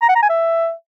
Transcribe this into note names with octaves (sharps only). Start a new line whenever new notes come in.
A#5
F#5
A#5
G#5
E5